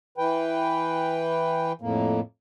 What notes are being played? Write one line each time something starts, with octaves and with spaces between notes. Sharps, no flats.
E3 B4 G5
F2 A2 A#3